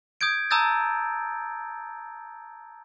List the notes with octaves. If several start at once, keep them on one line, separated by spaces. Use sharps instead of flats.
D#6 G6 G#6 D7
A5 A#5 D#6 E6 G6 A6